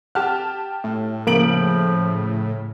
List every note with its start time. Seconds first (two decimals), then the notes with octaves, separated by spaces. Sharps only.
0.15 G4 F#5 A5 F6
0.84 A2
1.27 C#3 F3 A#3 D7 F#7